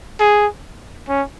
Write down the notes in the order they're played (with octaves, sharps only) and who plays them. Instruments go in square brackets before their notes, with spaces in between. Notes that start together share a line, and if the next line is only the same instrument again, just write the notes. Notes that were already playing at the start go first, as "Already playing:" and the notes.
[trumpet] G#4
C#4